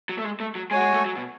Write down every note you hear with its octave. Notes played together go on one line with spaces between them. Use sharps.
F#3
A3
G#3
A3
F#3
G#3 F#4 C#5 G#5
G#3
A3
F#3
B2